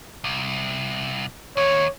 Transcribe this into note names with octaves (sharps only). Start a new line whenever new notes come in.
C2
D#2 C#5